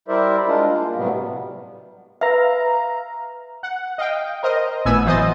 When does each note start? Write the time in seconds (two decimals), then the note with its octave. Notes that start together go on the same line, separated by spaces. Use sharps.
0.08 G3 E4 A#4 C5 D5 E5
0.47 G#3 D4 F4 A#4
0.68 A#3
0.96 A2 C3 F#3 G3 B3
2.21 B4 E5 F5 A#5
3.63 F#5
3.98 D#5 F5 G5
4.43 A#4 C5 D#5
4.85 G#1 A2 B3 G#5 E6
5.05 E3 F#3 C5 D#5 D#6 A6